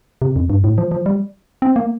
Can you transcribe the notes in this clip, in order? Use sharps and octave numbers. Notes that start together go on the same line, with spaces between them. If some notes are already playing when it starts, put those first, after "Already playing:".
C3
F2
G2
A2
F3
F3
G3
C4
A#3